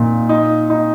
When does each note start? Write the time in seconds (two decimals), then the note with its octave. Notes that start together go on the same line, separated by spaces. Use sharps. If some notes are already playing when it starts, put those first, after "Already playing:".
Already playing: A#2 F3 D#4
0.29 D#4
0.70 D#4